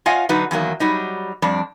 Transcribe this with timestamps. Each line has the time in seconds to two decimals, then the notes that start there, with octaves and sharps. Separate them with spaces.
0.06 F4 C#5 D#5 F5 F#5 G#5
0.29 D3 F#3 D#4 F#4 B4
0.51 E2 D#3 F#3 A#3
0.80 F#3 G3 D#4
1.42 F2 G3 D4